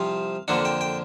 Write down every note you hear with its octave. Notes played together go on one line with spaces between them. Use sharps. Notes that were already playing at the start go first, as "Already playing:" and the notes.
Already playing: C2 C3 F3 F5
F2 D3 F3 A#3 D4 F#5
G5
G5